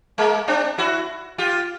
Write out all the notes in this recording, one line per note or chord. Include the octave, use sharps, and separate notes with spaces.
G#3 A#3
C4 D4
E4 F#4
F4 G4